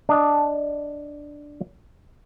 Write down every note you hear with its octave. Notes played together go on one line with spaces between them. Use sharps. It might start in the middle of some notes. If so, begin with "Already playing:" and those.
D4 D#5 A5